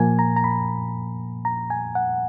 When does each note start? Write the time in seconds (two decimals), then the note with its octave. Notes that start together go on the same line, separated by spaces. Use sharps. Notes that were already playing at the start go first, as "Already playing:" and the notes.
Already playing: A#2 F3 A#3 G#5
0.19 A#5
0.36 A#5
0.44 B5
1.45 A#5
1.70 G#5
1.95 F#5